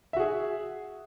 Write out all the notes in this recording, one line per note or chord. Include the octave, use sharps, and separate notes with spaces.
F#4 G#4 E5